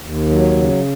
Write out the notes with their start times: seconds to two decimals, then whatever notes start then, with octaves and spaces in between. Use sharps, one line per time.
0.01 D#2
0.29 F#3
0.56 C#3